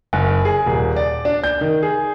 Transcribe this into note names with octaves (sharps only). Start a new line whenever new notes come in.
F#1
G#4
D#1
D5
D4
G6
D#3
G#4